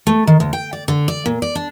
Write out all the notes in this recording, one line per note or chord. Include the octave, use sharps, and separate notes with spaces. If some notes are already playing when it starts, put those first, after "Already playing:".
A3
D#3
D2
G5
D5
D3
D5
A#2
D5
D4